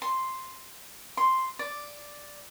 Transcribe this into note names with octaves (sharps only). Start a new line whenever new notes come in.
C6
C6
D5